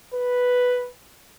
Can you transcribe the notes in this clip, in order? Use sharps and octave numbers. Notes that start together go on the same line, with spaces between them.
B4